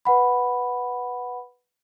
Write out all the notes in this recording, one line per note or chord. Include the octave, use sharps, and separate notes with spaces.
B4 F#5 B5